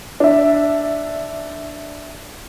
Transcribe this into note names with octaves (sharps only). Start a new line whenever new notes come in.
D4 E5